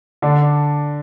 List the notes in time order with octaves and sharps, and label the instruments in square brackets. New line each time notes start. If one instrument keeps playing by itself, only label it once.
[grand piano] D3 D4